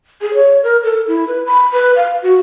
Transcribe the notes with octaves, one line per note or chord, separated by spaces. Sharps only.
G#4
C#5
A#4
A4
E4
B4
B5
B4
F5
F#4